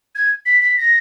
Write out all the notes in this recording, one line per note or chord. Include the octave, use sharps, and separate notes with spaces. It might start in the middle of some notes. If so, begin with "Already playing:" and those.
G#6
B6
B6
A#6